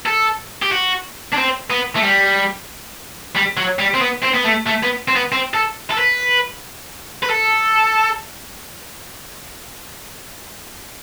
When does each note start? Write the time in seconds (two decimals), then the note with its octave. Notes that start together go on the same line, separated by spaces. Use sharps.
0.06 A4
0.62 G4
0.72 F#4
1.33 D4
1.37 C4
1.70 B3
1.96 A3
2.03 G3
3.35 G3
3.57 F#3
3.79 G3
3.94 C4
4.01 B3
4.22 C4
4.34 B3
4.44 A3
4.66 A3
4.83 B3
5.08 C4
5.16 B3
5.32 C4
5.54 A4
5.90 A4
5.98 B4
7.23 B4
7.29 A4